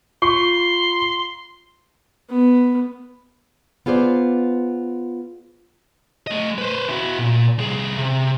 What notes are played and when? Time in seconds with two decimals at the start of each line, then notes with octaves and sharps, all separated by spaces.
0.22 F4 C6 C#6
2.30 B3
3.86 B3 F4 G#4 C5 D5
6.27 A3 D#5
6.58 B4 C5
6.89 E4 F#4
7.19 A#2
7.58 C2 G#4
7.98 C3